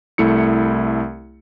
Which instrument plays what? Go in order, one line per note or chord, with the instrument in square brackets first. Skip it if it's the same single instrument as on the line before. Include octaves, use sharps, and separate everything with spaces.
[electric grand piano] C2 A3 E4 C#7